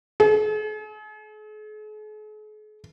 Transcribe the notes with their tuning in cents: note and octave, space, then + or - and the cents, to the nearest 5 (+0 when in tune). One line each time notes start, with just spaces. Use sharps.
G#4 +45